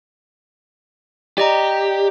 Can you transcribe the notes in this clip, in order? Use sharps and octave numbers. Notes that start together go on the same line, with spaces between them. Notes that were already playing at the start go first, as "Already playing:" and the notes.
G4 D5 D#5 A#5